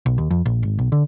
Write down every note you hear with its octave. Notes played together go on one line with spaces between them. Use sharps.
B1
D#2
F2
A#1
G#1
B1
D3